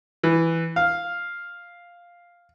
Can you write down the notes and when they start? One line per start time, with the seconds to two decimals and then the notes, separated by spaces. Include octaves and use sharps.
0.23 E3
0.76 F5